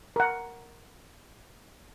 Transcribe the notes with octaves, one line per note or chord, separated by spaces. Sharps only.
A#4 F#5